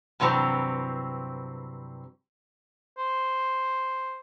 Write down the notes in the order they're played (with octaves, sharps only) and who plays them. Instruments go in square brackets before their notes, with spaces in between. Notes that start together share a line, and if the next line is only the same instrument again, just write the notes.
[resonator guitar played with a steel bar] G2 C3 E3 F#3 C4
[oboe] C5